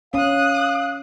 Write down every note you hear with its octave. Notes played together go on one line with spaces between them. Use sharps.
C#4 F5 D#6 F#6